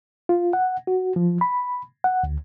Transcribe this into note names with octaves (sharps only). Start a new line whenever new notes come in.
F4
F#5
F#4
F3
B5
F#5
D2